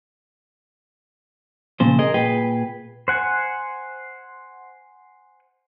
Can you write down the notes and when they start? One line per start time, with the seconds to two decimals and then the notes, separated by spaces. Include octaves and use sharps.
1.80 A#2 C#3 F3 C5
1.99 G#4 A#4 D#5
2.14 A#2 G#4 B4 G5
3.08 C5 F#5 G#5